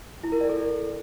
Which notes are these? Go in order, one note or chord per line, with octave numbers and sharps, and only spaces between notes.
E4
A#4
D5
A4